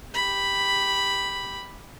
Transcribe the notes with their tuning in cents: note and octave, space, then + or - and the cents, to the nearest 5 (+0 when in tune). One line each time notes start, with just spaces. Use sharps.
G4 +0 B5 +0